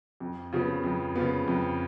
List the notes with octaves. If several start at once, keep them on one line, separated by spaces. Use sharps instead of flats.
F2
C#3 F3 B3
F2
C#3 F3 B3
F2